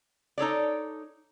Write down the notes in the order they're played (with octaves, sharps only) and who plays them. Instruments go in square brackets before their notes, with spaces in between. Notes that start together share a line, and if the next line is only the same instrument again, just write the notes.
[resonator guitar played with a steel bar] D#4 A4 C#5 D5